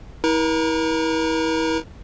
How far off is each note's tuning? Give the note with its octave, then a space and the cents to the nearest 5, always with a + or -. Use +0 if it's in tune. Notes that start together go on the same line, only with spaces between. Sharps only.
E4 -35 A#4 +40 A#5 +0